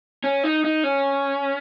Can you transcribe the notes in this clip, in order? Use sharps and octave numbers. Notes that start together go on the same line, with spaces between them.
C#4
D#4
D#4
C#4